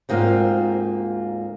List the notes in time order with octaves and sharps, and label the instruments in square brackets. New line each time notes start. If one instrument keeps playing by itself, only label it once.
[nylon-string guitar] D2 G#2 A#3 C4 F4 F5